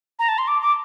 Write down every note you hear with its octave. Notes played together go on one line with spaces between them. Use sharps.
A#5
A5
C6
D6
D6